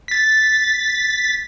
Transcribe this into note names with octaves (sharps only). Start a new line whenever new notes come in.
A6 B6